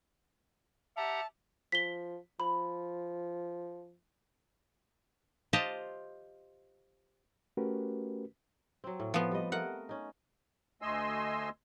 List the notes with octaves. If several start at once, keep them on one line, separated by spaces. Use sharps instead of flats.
G4 E5 F#5 A5 A#5
F3 B6 G7
F3 B5
F4 G4 C5 D#5 A5
A3 C#4 F#4 G4 A#4 B4
F#3 C4
A2
F3 B3
G3 D#5
A3 A#4 D#5 F#5
C#4 D#4
D2 A3 D#5 G#5 C6 E6